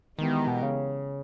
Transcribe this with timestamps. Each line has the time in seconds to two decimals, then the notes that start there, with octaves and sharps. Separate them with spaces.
0.18 D#3 E3 G#3 B3 G4 A#4
0.47 B2
0.62 C#3